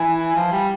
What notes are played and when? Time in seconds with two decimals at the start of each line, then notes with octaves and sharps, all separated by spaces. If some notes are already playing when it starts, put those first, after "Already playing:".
Already playing: E3 G#5
0.35 F3
0.51 G3